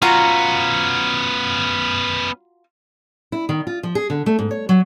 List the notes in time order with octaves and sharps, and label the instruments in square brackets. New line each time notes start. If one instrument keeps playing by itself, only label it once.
[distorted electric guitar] B3 C#4 [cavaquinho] F4 F#4 A#5
[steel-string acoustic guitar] E4
D#3
F4
F3
G#4
D3
A3
G#2
C#5
F#3